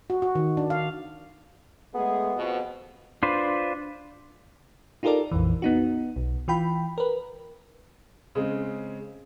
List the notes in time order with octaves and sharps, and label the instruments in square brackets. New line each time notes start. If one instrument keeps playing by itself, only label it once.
[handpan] F#4
F#4
D#3
D4
F5
[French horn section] G#3 A3 G#4 [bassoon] B3
[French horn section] F2 B2
[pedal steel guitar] D4 F4 B4 C5
[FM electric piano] D#4 F4 G4 A4 A#4 D5
A#1 F2 E3
B3 D#4 F#4
B1
E3 F4 G5 B5
A#4 B4
[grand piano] C#3 G#3 C4